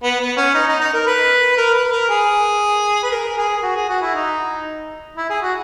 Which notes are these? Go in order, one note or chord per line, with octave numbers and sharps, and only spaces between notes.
B3
B3
C#4
D#4
D#4
D#4
A#4
B4
A#4
B4
A#4
G#4
B4
A#4
G#4
F#4
G#4
F#4
E4
D#4
E4
G#4
F#4